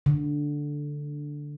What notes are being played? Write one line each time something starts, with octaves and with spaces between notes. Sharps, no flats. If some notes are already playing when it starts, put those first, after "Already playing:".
D3